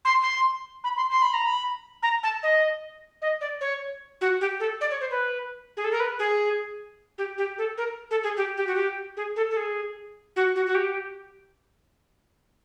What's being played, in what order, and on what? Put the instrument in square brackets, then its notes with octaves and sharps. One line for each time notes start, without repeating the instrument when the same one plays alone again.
[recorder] C6
C6
B5
C6
C6
B5
A#5
B5
A#5
A5
D#5
D#5
D5
C#5
F#4
G4
A4
D5
C#5
C5
B4
G#4
A4
A#4
B4
G#4
G4
G4
A4
A#4
A4
G#4
G4
G4
F#4
G4
G#4
A4
A4
G#4
F#4
F#4
F#4
G4